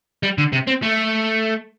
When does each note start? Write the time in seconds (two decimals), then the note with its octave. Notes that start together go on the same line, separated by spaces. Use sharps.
0.23 G3
0.38 D3
0.53 C3
0.68 C4
0.83 A3